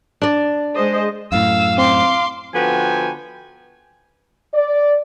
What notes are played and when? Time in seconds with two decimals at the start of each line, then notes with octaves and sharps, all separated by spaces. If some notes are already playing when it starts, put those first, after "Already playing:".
0.22 D4 D5
0.75 G#3 C5 D#5
1.32 F#2 A2 F5 E6
1.78 C4 C6 D6
2.54 D3 F3 B3 F#4 G5 G#5
4.55 D5